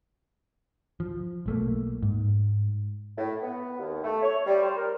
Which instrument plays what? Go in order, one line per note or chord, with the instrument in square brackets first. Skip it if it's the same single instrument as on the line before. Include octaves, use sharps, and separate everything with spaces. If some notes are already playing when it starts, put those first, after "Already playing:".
[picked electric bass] F3
B1 A3 A#3
G#2
[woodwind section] A2
B3
D#2
A3
C#5
G3
C5
A#4